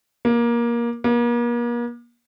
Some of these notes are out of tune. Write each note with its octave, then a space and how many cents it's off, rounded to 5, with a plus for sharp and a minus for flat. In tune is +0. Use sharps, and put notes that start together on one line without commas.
A#3 +20
A#3 +40